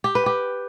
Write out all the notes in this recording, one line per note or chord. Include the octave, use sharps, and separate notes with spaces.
G4
B4
G4